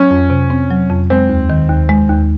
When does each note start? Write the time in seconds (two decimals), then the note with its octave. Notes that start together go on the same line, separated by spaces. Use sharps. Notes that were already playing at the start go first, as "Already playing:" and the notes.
Already playing: F#3 C#4
0.11 F2
0.30 C3
0.50 C4
0.70 F#3
0.90 F2
1.10 G#3 C4
1.29 D#2
1.50 D#3
1.69 D#2
1.89 G#3
2.09 D#2